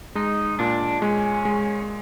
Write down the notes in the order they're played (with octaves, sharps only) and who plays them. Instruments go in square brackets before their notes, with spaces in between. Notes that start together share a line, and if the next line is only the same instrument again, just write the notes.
[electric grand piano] G#3 [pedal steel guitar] D#4
[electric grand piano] A#2 [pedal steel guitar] D4
[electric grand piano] G#3 [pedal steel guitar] C#4
[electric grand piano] G#3